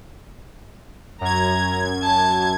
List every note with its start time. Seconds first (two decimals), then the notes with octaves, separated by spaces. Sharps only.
1.21 F#2 A#5 G#6
2.03 A5